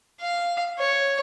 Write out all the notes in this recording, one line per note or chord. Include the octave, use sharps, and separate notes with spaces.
F5
C#5